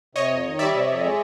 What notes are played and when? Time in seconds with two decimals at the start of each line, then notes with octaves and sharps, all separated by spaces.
0.15 C3 C#5 D#5
0.30 F2
0.45 D#3
0.59 G3 D5 E5
0.73 C3
0.88 F2
1.03 G#3